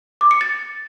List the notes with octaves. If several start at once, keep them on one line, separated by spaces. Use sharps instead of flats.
D6
C#7
A6